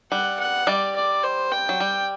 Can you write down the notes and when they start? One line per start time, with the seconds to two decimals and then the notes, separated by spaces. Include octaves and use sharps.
0.11 G3 F#5
0.39 F#5
0.67 G3 D5
0.96 D5
1.23 C5
1.51 G5
1.69 F#3
1.80 G3